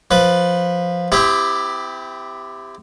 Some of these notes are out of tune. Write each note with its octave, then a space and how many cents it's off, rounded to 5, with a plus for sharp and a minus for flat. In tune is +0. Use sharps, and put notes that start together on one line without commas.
F3 +5 B4 +0
C4 -40 E4 +0 G4 +10